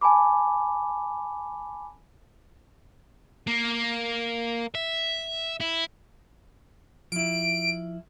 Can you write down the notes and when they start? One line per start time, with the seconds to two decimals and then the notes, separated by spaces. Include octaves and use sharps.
0.01 G#5 A5 B5 D6
3.47 A#3
4.75 E5
5.60 E4
7.12 F3 E4 D7